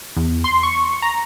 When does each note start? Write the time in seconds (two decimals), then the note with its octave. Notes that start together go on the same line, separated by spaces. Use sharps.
0.16 E2
0.44 C6
0.63 C#6
1.02 A#5